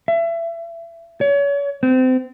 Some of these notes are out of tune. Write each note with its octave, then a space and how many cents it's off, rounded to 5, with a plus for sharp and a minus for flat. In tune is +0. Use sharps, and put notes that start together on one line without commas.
E5 +30
C#5 +35
C4 -30